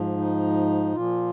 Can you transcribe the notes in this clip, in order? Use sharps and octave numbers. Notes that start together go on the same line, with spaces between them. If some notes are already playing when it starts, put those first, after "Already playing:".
Already playing: G#2 F3
D#4
A#2 F3 F4